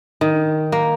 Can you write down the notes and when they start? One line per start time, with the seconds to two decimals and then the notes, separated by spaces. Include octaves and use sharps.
0.21 D#3
0.72 A#3